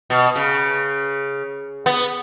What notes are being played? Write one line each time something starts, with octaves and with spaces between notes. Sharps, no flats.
B2
C#3
B3